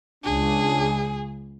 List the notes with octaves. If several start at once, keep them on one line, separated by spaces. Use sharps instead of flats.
C#2 C#3 D4 G#4